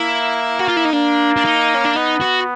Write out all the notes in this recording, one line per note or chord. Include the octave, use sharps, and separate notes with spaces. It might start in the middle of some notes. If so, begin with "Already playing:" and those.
Already playing: A#3 E4
F#4
F4
E4
D#4
A#3 D4
D4
D#4
C#4
D4
B3 D#4
F#4